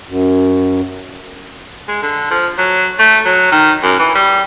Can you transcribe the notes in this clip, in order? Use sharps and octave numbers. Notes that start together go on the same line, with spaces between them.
F#2
G#3
D3
F3
F#3
A3
F#3
D#3
F#2
E3
G3